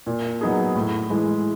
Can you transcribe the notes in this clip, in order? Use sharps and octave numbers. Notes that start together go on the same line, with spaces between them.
A#2
F#3 B3 D#4 G#4
A2
E3 G#3